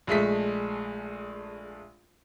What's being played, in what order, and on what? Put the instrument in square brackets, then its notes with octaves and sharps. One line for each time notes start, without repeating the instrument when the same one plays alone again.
[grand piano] A#1 G#3 A3 B6